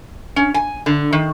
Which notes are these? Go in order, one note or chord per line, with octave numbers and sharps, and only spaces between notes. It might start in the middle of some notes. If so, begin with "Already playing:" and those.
C#4
G#5
D3
D#3